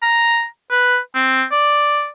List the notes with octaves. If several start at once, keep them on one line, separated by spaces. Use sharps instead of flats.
A#5
B4
C4
D5